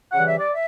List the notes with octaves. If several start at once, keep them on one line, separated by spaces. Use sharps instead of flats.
C#3 E3 G3 F#5
E5
D5
E5